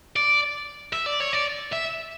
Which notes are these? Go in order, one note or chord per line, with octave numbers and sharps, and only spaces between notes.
D5
E5
D5
C#5
D5
E5